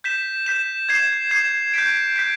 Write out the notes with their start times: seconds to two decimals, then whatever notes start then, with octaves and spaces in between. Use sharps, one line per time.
0.04 G6 B6 E7
0.46 G6 B6 E7
0.89 G#6 C7 E7
1.31 G#6 C7 E7
1.74 G6 B6 D7
2.16 G6 B6 D7